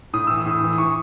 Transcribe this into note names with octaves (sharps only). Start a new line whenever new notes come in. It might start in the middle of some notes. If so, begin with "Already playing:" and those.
A2 D#6
E3 E6
D#6
A2
E3
D#6
E3 C#6